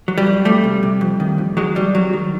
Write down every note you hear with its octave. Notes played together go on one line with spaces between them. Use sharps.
F#3
G3
F2
F2 G3 A3
C3
C3
F2
D#3
F2
D#3 F#3 G#3
F2 G3
F2 F#3
D#3